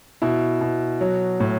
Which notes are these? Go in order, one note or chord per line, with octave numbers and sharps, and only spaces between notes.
B2 E4
B2
F#3
A2